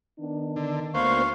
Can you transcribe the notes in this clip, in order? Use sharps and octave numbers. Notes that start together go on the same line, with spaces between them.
D#3 B3 D4
D3
D2 A#3 B3 C5 F5 C#6